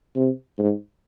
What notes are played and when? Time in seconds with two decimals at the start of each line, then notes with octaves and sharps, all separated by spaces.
0.16 C3
0.59 G#2